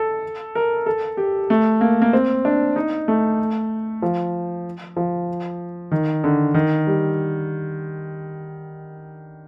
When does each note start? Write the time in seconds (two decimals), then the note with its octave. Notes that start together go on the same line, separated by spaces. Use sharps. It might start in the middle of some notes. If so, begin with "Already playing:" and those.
Already playing: A4
0.55 A#4
0.86 A4
1.17 G4
1.50 A3
1.81 A#3
2.02 A#3
2.13 C4
2.45 D4
2.76 D#4
3.08 A3
4.02 F3
4.96 F3
5.91 D#3
6.24 D3
6.54 D#3
6.87 G3